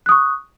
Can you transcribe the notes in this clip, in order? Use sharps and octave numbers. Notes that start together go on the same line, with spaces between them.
C#6 D#6 F#6